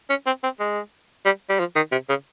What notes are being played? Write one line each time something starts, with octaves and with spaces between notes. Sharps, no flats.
C#4
C4
C4
G#3
G3
G3
F3
D#3
C3
C#3